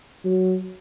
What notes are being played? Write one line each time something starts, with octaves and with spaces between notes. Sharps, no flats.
F#3